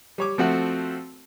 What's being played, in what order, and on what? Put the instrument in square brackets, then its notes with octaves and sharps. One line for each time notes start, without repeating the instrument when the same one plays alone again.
[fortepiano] G3 C#5 D6
F3 A3 C4 F#4 E5 F#5